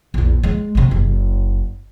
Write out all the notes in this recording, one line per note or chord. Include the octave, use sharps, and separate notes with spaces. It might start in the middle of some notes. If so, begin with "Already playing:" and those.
A#1 E2
G#3
D2 C3
F#1